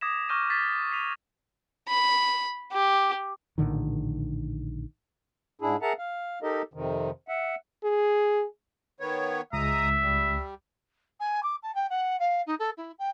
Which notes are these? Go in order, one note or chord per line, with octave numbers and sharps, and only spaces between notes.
D6 D#6 G#6 A#6 B6 E7
C#6 D6 F6 G6 A#6 D#7
G#6 A6 B6 C7
B6 C7 D#7 F7
B5
G4
A#1 A2 D3 D#3
G#2 D4 E4 G#4
G#4 A#4 E5 F#5 A5 A#5
F5
D#4 G4 A4 A#4 D#5
F2 C3 D#3
E5 F#5
G#4
D#3 B3 C#5
C#2 G#3 E5 A#5 D#6
G3
G#5
D6
A5
G5
F#5
F5
D#4
A4
E4
G5